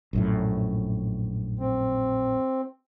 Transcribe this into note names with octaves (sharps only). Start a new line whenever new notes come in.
A#1 F#2 A2
C4